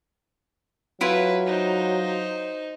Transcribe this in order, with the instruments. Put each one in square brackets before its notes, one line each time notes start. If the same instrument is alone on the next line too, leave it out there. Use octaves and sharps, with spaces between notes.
[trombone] F#3 [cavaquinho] E4 F4 G#5 [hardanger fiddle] B4
[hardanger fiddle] D#4 C5